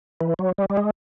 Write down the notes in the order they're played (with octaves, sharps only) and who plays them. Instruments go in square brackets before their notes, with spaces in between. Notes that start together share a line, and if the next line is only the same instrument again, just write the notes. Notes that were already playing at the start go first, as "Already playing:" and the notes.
[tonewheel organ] E3
F#3
G3
G3
G#3